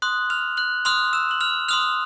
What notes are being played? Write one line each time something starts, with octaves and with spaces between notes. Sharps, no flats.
C6 D#6 F#6 F#7
F6 F7
F#6 F#7
C6 D#6 F6 F#6 F7
E6 E7
F#7
F6 F7
C6 D#6 F6 F#6 F7